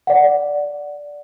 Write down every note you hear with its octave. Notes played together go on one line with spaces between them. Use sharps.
D5 F#5